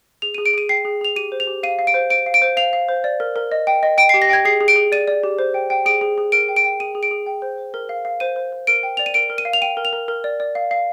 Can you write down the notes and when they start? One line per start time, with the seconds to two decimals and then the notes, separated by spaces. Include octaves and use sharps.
0.22 G#4 F7
0.34 D#7
0.38 G#4
0.46 D7
0.54 G#4 D#7
0.69 G5 C7
0.85 G#4
1.01 G#4 F7
1.16 G4 D#7
1.32 C5
1.40 F7
1.47 G4
1.63 F5 D#7
1.79 F5
1.87 D7
1.94 C5
2.10 C5 D7
2.26 F5
2.34 D7
2.42 C5
2.57 F5 F7
2.73 F5
2.89 C5
3.04 D5
3.20 A#4
3.36 A#4
3.52 D#5
3.67 G5
3.83 D#5
3.98 G5 D7
4.09 C7
4.14 G4
4.22 A#6
4.29 G5 G#6
4.45 G#4 C7
4.60 G#4
4.68 D7
4.76 G#4
4.92 D5 D#7
5.08 D5
5.23 G4
5.39 C5
5.54 G5
5.70 G5
5.86 G#4 D7
6.01 G#4
6.18 G#4
6.32 A#4 D7
6.49 G5
6.56 D7
6.64 G5
6.80 G#4 D#7
6.95 G#4
7.03 D7
7.11 G#4
7.26 G5
7.42 C5
7.58 C5
7.74 A#4
7.89 F5
8.05 F5
8.20 C5 D#7
8.36 C5
8.52 C5
8.67 A#4 D7
8.83 G5
8.97 D5 F7
9.06 D#7
9.14 A#4 D7
9.30 A#4
9.38 D#7
9.45 F5
9.53 F7
9.61 G5 D#7
9.77 A#4
9.85 F7
9.93 A#4
10.08 A#4
10.24 D5
10.40 D5
10.55 F5
10.71 F5